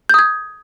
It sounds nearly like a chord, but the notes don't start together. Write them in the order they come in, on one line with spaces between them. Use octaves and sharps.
G6 D#6 G#6